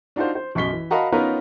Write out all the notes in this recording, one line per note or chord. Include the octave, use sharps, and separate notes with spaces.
D4 D#4 F4 F#4 C5
C5
B1 F#2 C#6 B6 G7
E3
F#4 A#4 D#5 F5 A5 B5
B3 C#4 D#4 F4 A#4 B4